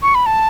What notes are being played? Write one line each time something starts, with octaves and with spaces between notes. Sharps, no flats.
C#6
B5
A5